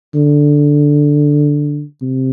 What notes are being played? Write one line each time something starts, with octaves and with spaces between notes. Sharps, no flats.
D3
C3